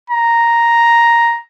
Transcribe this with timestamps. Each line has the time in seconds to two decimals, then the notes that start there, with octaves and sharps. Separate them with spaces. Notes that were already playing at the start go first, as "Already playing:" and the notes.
0.10 A#5